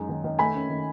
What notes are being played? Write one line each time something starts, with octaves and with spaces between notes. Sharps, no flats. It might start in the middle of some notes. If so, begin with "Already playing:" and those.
Already playing: F#2 G#3 D#4
D#3
D#3
A3 G#5 B5
C#4
D#3